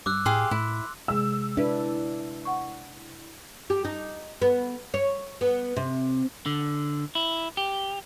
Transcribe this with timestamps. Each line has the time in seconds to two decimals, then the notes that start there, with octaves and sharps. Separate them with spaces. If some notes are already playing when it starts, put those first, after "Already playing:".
0.06 G2 D6 E6 F#6
0.26 A2 G4 G#4 F5 C6
0.51 A2 E4
1.08 C3 G#3 G#4 E6
1.57 D4 E4 B4
2.45 F#5 C#6
3.70 G4
3.85 D#4
4.42 B3
4.94 C#5
5.41 B3
5.76 C3
6.46 D3
7.15 E4
7.57 G4